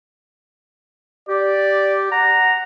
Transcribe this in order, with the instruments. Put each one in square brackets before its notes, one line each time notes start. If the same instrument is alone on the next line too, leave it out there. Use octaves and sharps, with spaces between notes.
[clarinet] G4 [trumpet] D5
[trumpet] F#5 [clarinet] A#5